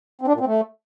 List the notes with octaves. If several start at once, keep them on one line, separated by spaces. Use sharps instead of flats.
C4
D4
A#2
C4
A3